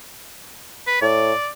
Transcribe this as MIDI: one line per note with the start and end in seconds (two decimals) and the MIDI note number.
0.87 1.01 71
1.02 1.33 45
1.02 1.48 74